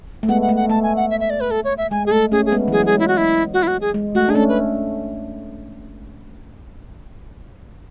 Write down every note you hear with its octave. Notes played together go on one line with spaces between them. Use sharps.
A3
G#3 B3 F#5
F#5
A3
F#5
A3 A5
G#5
F#5
E5
E5
D5
B4
A4
C#5
E5
G#3 G#5
G#4
A3 A4
A3 C#4 G#4
G#4
G#3 B3
E3
F#3 G#4
F#3
G#4
G#3
E4
F#4
E4
F#4
E4
F#4
G#4
G#3
A3 F#4
D4 G#4
A3 C#4 A4
B4